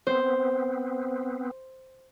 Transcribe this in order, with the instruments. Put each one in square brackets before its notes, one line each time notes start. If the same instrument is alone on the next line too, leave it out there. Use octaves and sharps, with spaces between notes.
[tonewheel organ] B3 C4 [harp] C5